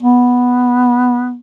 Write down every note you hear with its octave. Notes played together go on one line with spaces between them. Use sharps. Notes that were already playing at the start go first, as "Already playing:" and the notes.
B3